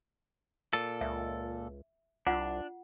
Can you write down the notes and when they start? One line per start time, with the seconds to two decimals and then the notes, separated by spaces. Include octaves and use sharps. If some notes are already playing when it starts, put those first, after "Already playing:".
0.73 A#2 A4
1.01 C#2 E5
2.27 C2 D4 F4 F#5